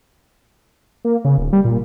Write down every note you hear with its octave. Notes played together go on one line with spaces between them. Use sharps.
A#3
C#3
D1
G3
A#2